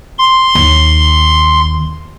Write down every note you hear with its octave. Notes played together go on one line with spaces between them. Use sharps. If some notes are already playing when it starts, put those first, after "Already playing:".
C6
D#2